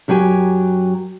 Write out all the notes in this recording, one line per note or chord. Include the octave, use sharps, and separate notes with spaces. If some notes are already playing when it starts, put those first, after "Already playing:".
F#2 F#3 G4 G5 G#5